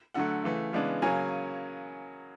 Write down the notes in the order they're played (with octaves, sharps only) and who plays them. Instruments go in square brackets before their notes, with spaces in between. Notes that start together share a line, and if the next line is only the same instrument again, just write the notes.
[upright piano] D3 F#3 A3 F#5
C#3 E3 A3
C#3 E3 G#3 B3 D4
C#3 F#3 A#3 C#4 G#5